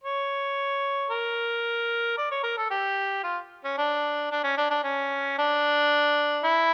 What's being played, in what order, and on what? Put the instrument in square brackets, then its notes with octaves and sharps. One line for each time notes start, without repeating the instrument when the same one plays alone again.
[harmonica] C#5
A#4
D5
C#5
A#4
A4
G4
F4
C#4
D4
D4
C#4
D4
D4
C#4
D4
E4